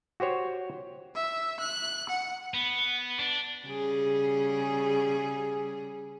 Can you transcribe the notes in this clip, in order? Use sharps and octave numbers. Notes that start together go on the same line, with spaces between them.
F#4 G4 C5 C#5
E5
F#6
F#5
B3
D4
C#3 G3 G#4